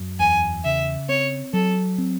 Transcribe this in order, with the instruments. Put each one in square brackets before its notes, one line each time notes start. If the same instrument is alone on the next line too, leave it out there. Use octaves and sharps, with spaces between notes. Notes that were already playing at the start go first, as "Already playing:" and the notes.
Already playing: [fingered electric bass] F#2
[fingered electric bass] E2 [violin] G#5
[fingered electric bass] C#3 [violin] E5
[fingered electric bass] C4 [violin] C#5
[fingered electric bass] F#3 [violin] A4
[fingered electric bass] C4